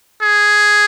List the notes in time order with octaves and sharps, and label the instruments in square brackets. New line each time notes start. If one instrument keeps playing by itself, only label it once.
[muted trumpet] G#4